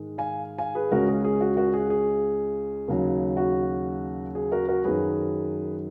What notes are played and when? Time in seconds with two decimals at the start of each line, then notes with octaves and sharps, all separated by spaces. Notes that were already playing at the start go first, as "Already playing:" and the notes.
Already playing: G#2 D#3 G#3
0.18 F5 G#5
0.58 F5 G#5
0.75 G#4 B4
0.92 C#2 C#3 G#3 C#4 F#4 A#4
1.08 G#4
1.24 G#4
1.41 F#4
1.57 F#4 A#4
1.74 G#4
1.90 G#4
2.88 D#2 C#3 F#3
3.37 F#4
4.35 G#4
4.52 F#4 A#4
4.68 F#4 A#4
4.85 F#2 D#3 F#3 G#4 B4